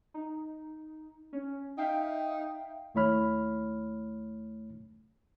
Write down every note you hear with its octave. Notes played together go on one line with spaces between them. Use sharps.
D#4
C#4
D#4 E5 F5 G5
D#2 A3 E4 C#5 B5 F6